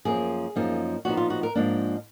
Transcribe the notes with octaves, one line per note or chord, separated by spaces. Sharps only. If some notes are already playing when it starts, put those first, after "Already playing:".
F#2 F3 A#3 G#4
F#2 F3 A#3 D#4
A#2 F3 B3 D#4 F#4
F4
F#4
A#4
G#2 F3 A#3 D4